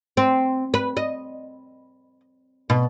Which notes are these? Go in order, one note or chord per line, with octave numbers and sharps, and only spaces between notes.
C4
B4
D#5
B2